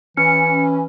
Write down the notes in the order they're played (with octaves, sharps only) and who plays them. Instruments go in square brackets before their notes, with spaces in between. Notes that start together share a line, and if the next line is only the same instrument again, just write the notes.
[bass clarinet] E3 [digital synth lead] C#4 [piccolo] C#7